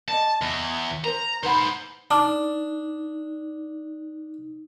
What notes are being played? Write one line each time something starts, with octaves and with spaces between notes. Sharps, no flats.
D5 D#5 A5
E2
A#4 C5 A#5
D#4 B4 C5 F#5 B5
D4 D#4 A5 D6 F6